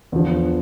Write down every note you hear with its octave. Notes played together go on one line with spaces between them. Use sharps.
E2 D3 F3